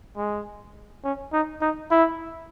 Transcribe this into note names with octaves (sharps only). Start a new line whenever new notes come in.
G#3
C#4
D#4
D#4
E4